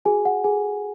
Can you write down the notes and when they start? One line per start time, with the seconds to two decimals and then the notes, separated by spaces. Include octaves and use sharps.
0.05 F#4 G#4 G#5
0.25 F#5
0.44 G#4 A4 G#5